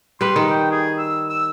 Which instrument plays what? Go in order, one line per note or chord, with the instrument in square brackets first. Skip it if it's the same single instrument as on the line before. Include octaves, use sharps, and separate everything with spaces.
[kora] G3 B4 [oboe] C6
[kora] D#3
[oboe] G5
G#4
E6
E6